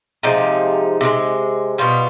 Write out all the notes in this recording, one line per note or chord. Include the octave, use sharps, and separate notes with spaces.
C3 F3 G#3 D#4
C3 F3 G#3
B2 G3 F4